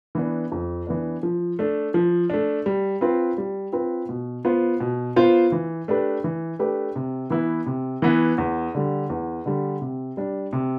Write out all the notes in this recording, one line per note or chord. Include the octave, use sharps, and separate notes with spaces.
E3 B3 D4
F2
E3 B3 D4
F3
A3 D4
F3
A3 D4
G3
C4 F4 B4
G3
C4 F4 B4
B2
B3 F4 C5
B2
B3 F4 C5
E3
A3 D4 G4 B4
E3
A3 D4 G4 B4
C3
E3 B3 E4
C3
E3 B3 E4
E2
D3 G3
E2
D3 G3
C3
G3 D4
C3